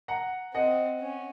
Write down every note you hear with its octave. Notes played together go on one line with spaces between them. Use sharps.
F#5 A#5
C4 D#5 F#5
C#4